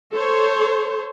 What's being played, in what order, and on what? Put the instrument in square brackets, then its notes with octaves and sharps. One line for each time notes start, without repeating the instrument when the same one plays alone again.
[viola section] A4 C5 C#5